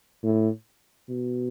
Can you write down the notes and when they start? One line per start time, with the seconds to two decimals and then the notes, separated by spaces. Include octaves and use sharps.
0.23 A2
1.09 B2